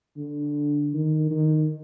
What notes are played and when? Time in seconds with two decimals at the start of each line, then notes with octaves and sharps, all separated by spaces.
0.17 D3
0.94 D#3
1.31 D#3